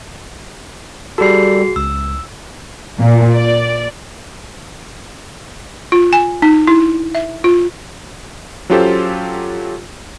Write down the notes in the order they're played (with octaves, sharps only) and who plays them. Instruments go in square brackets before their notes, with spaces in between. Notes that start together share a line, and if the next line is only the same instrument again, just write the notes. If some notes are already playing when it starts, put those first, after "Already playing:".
[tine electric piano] G3 A4 [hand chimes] F#4 G#4 C7
[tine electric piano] C#2 [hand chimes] E6
[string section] A#2
D5
[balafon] F4
G#5
D#4
E4
E5
F4
[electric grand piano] F#3 C#4 F4 G4 A4 C5